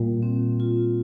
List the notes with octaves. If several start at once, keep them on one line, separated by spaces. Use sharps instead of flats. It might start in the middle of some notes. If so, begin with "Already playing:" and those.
Already playing: A#2 G3
C4
F4